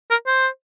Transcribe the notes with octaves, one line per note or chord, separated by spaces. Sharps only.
A#4
C5